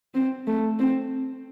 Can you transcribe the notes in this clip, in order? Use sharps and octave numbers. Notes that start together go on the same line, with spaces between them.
C4
A3
C4